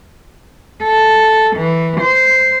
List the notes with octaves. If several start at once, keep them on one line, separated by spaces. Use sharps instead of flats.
A4
E3
C5